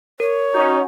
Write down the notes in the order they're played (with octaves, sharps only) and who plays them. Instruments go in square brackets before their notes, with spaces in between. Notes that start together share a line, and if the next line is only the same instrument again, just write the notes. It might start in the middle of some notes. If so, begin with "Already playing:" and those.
[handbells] A#4 [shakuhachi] C#5
[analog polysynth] C#4 F#4 [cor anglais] D#4 [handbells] G6